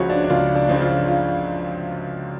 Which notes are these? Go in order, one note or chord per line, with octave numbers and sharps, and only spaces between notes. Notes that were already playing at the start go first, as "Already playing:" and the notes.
Already playing: C#2 C#3 F3 F#4 C#5
D4
D4
C#2 F4
D4
C#3 F3 D4
F4
F4